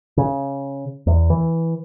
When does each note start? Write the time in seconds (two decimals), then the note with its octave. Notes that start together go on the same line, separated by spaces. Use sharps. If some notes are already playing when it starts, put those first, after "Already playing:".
0.17 C#3
1.07 E2
1.30 E3